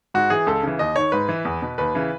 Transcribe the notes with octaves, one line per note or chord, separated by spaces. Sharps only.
G#2 F#4
E3 G#4
C#2 A4
C#3 E3
D#2 D#5
D#3 C#5
G#2 B4
E3
E2
B2
D#2 B4
C#3 E3